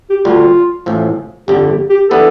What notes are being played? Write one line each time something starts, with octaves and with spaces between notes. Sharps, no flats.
G4
D2 D3 G3 F4
A1 A2 F3
G1 F2 D3 G4
G4
G4
E3 B3 D4 A4